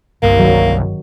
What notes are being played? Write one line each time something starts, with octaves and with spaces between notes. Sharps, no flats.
G1 C2 A#3
D#3 F#3